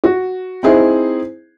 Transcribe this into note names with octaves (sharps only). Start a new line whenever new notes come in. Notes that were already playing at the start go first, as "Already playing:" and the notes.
F#4
C4 D#4 E4 G#4 C5